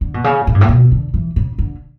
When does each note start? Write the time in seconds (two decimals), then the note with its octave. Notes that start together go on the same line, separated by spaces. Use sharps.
0.01 D3
0.14 B2
0.24 C#3
0.47 A2
0.55 G2
0.61 A2
0.69 B2
0.92 D3
1.14 E3
1.36 C#3
1.59 D3